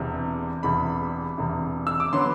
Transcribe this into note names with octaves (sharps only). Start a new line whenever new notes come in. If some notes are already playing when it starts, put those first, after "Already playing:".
Already playing: E1 E2 C3
E1 E2 C3 B5
E1 E2 C3
E6
D6
D3 F#3 B3 C6